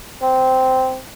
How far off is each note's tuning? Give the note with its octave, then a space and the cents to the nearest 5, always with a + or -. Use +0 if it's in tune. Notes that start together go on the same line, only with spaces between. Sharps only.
C4 -10